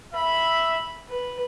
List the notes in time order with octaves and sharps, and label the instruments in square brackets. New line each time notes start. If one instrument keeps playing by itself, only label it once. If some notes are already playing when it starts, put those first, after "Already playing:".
[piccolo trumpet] E5 [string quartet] B5
[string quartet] B4